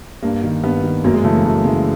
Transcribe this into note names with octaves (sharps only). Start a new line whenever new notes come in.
G2 A#3
D#3
G2 B3
D#3
F#2 A#3
G#3
C#3 E3 A3
A#3
F#2 A3
C#3 E3 G#3